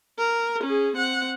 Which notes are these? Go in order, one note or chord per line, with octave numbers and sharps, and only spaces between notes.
A#4
C#4 G#4
C4 F#5